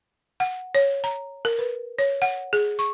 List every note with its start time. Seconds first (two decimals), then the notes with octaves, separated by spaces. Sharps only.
0.40 F#5
0.75 C#5
1.04 A#5
1.45 A#4
1.59 B4
1.99 C#5
2.22 F#5
2.53 G#4
2.79 C#6